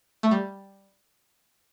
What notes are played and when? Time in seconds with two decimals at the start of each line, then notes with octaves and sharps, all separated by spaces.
0.23 A3
0.31 G3